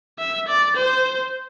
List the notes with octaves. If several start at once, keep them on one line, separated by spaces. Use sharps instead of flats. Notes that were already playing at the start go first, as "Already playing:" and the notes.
E5
D5
C5